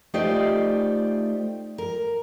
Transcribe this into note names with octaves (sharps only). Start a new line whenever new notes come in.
A3 D#4 F4 G4 C5 D5
A#4